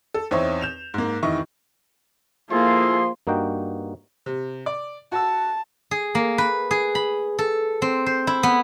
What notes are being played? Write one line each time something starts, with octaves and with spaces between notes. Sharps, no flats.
A4
E2 C4 D#4 C5 C#5 E5
G6 E7 F7
G#2 A#3
F1 D#3 E3 D#5 E5 C#6
F3 A#3 E4 F4 G#4 A4 C6
G2 A#3 D#4 F#4 G5
C3
D5
F#4 A5 E6
G#4
A#3
B4
G#4
B5
A4
C4
C5
E4
B3